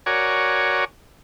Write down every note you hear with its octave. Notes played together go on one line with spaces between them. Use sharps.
F#4 A#4 C#5 D5 G#5